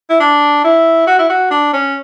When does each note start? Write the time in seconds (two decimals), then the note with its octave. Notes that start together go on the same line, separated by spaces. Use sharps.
0.10 E4
0.20 D4
0.64 E4
1.07 F#4
1.19 E4
1.30 F#4
1.51 D4
1.73 C#4